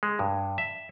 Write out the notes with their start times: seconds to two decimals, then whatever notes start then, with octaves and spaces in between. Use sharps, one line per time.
0.03 G#3
0.19 G2
0.58 E5